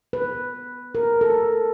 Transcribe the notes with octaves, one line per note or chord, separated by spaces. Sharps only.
B4
A#4
A4